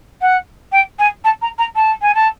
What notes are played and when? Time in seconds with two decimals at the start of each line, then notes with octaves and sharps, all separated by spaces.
0.21 F#5
0.71 G5
0.98 G#5
1.24 A5
1.41 A#5
1.58 A#5
1.75 A5
2.01 G#5
2.14 A5